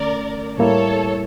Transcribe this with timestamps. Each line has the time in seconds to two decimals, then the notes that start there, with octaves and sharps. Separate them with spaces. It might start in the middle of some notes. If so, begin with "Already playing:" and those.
Already playing: D3 A3 C#4 A#4 D5
0.58 A2 G3 A#3 E4 A4 C#5